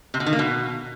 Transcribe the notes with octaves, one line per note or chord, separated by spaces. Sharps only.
C3
B2
D#3
A#3
B2